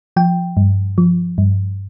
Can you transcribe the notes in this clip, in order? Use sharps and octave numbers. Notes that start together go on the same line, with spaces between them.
F3 G5
G2
F3
G2